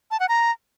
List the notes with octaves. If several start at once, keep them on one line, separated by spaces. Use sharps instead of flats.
A5
F#5
A#5